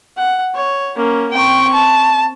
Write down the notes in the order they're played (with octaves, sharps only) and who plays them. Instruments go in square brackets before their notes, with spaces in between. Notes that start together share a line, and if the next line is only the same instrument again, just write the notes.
[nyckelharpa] F#5
C#5
A#3 C#4
[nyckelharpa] C4 C#6 [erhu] G5
[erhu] A5